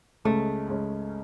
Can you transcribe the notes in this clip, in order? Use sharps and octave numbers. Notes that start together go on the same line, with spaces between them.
C#2 C#3 G#3 A3 C#4
C#2 C#3 G#3 C#4